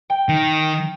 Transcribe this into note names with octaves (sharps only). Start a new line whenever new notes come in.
G5
D#3